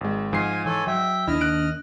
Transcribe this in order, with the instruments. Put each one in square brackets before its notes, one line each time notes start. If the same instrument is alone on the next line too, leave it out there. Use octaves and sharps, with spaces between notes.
[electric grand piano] G#1 G#3
[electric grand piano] G#2 C7 [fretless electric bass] F3 [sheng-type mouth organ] F4 G#5
[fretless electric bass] E3 [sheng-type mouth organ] A4 C#5 G#5
[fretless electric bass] F#3 [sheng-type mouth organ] E5 G5
[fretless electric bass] D#2 D#3 [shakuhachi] D4 [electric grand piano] E4 [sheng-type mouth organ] D#5 F6
[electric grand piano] F#6 D7